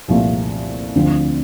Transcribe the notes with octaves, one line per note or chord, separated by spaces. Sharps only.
C2 A#2 F3 A3
D2 D3 F3 C4